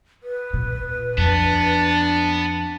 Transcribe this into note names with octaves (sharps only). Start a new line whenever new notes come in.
B4
A#2
F2 B3 D4 A5